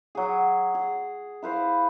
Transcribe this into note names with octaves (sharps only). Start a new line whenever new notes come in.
F#3 G#4
G#4
E4 B4 C5 F5